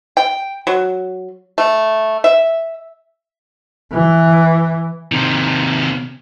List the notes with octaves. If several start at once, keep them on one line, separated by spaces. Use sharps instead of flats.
G5
F#3
A3
E5
E3
C3 D#3